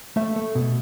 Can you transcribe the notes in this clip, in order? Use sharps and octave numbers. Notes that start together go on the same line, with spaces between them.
A3 E5
A3
B2